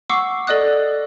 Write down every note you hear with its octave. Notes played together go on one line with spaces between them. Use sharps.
F#5 C#6 D6 E6 C7
A4 D5 D#5 D#6 F#6